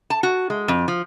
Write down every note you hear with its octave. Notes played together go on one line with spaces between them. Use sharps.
A5
F#4
G#3
F2
F3